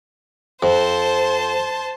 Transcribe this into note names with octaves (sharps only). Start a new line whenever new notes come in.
F2 C5 A5